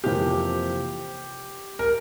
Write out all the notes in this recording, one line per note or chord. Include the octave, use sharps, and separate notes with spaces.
F2 C3 E3 A#3 G4
A#4